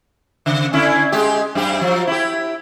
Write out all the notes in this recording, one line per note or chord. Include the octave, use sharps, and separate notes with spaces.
C#3
D3 C#4 E4
G#3 G4
F#2 G4
F3 F#3
E4 G4